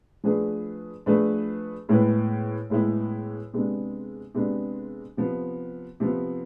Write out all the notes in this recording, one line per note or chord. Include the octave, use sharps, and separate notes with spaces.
F3 A3 D4 G#4 B4
F3 A3 D4 G#4 B4
A2 G#3 B3 E4 B4
A2 G#3 B3 E4 B4
C3 G#3 B3 D4
C3 G#3 B3 D4
C3 F3 B3
C3 F3 B3